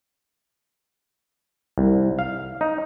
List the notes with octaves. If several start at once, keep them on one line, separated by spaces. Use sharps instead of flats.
C2
F5
D#4